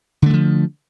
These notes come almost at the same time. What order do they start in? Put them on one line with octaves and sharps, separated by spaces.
D3 A3 E3 F3